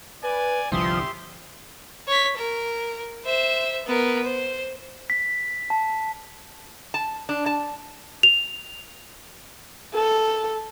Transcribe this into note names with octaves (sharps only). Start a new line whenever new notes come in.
B4 D5 G#5
G1 C2 F3 G3 G4 E5 C6 D#6
C#5 B6
A#4
C5 E5
B3 A#4
C5
B6
A5
A5
D4
A5
F7
A4